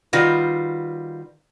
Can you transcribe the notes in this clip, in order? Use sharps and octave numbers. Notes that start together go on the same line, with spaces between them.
D#3 G3 F4 F#4 B4